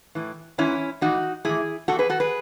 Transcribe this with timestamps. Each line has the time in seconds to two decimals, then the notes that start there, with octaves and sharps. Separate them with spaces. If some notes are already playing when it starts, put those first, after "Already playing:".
0.15 A2 E3
0.58 G#2 E3 C#4 E4
1.01 A2 E3 D#4 F#4
1.45 A2 E3 E4 G#4
1.88 B2 F#4 A4
1.92 E2
1.99 G#4 B4
2.10 F#4 A4
2.20 G#4 B4